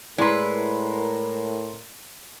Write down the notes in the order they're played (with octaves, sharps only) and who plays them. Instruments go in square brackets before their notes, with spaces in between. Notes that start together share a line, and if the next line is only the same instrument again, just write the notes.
[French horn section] A2 A#4 [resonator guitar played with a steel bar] G#3 B4 [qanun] E4 [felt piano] D5 A#5 C6